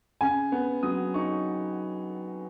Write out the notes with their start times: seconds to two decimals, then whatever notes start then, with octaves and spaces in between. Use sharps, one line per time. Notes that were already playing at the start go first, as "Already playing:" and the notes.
0.21 C#3 G#5
0.52 B3
0.83 F#3 D#6
1.14 D#4 C#6